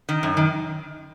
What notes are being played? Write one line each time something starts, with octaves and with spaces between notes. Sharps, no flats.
D#3
F#2
D#3